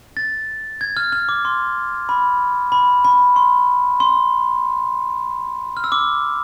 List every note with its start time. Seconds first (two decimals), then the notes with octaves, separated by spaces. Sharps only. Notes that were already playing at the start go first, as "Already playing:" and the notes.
0.17 A6
0.81 G#6
0.97 F6
1.13 F6
1.29 D6
1.45 C6
2.09 B5
2.72 B5
3.05 B5
3.36 C6
4.00 C6
5.77 F6
5.84 E6
5.92 D6